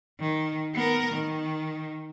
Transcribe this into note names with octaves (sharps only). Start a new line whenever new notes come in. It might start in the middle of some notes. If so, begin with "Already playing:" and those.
D#3
B3 A#4
D#3